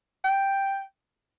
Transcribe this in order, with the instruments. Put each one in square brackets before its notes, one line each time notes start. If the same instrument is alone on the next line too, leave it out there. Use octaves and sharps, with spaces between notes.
[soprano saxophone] G5